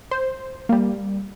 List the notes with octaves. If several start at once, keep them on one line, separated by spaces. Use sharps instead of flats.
C5
G3 A#3